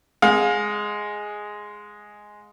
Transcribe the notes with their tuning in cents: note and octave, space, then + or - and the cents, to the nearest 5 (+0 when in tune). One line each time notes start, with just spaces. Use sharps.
G#3 +0 F5 +35